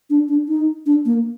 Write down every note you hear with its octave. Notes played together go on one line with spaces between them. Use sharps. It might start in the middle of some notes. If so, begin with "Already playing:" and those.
D4
D4
D#4
D4
A#3